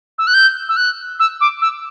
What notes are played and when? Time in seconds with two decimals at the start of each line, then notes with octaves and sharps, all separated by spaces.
0.18 E6
0.27 F#6
0.34 G6
0.69 E6
0.77 F#6
1.19 E6
1.41 D6
1.62 E6